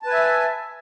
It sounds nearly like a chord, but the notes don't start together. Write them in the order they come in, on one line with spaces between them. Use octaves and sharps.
A5 B4 G#5 E5